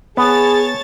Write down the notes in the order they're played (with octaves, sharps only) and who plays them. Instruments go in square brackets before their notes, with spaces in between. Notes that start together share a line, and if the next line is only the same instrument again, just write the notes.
[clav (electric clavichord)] B3 [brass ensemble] G#4 [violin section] C#5 A5 A6